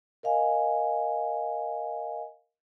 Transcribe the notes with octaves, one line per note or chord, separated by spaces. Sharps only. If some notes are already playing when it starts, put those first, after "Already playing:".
A#4 D#5 F5 G#5